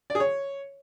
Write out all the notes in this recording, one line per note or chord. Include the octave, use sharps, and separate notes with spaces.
D5
G#4
C#5